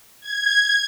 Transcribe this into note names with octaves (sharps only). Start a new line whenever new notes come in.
G#6